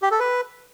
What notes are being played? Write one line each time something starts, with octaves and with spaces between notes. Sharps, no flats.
G4
A4
B4